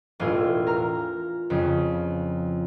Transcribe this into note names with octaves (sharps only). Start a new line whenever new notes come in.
E1 A2 F4 G#5
A#4 A#5 F6
F2 C#3